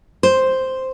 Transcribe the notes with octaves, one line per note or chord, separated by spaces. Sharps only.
C5